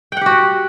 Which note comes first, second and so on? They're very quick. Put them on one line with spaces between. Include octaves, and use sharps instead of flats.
G5 F#5 G4 F#4